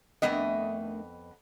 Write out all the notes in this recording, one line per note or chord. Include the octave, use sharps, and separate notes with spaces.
F2 D#3 A3 B3 D4 D#5